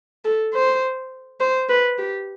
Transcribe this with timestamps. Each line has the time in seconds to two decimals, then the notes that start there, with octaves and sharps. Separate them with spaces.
0.25 A4
0.53 C5
1.40 C5
1.69 B4
1.98 G4